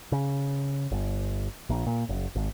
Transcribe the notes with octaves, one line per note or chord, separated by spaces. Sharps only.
C#3
G1
A#1
A#2
F#1
G#1